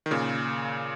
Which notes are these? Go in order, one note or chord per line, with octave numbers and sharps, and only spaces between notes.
D#3
A#2 C#3